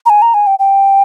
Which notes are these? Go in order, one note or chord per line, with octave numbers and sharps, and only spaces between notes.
A#5
G#5
A#5
G#5
G5
G5